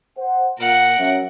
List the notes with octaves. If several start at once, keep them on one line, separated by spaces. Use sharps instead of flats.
C5 F#5
A#2 A#4 F#5
F#3 C#4 E5